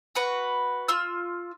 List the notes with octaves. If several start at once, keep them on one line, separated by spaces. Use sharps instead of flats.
F#4 B4
F4 E6